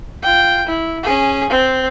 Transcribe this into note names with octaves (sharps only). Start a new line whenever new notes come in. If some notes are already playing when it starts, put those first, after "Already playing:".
F4 G5
E4
C#4 G#4
C4